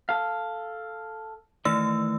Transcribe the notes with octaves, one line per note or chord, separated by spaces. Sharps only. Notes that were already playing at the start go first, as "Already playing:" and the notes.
A4 F5
D#3 E3 A3 D#4 E6